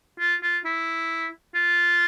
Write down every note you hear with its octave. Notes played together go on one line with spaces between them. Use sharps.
F4
F4
E4
F4